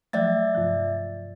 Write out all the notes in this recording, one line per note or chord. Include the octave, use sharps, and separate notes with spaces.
F3 F#3 A3 D5 E5 A6
G2 C3 F3